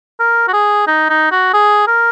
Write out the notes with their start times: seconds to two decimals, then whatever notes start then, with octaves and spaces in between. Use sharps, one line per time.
0.20 A#4
0.48 F#4
0.53 G#4
0.87 D#4
1.09 D#4
1.32 F#4
1.54 G#4
1.87 A#4